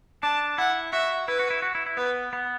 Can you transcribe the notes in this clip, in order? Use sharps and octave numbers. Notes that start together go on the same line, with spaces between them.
D4 A5
E4 F#5
F#4 E5
E4 B4
F#4
E4
F#4
E4
E4
B3 B4
B3